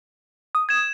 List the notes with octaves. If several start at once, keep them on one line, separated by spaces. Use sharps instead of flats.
D#6
G#6 E7